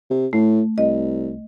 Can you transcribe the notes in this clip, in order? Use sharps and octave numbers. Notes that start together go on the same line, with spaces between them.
C3
A2 A3
C2 D#5